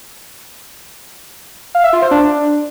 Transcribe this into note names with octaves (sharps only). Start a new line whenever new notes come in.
F5
E5
F4
C5
D4